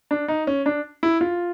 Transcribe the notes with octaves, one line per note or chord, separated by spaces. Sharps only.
D4
D#4
C#4
D4
E4
F4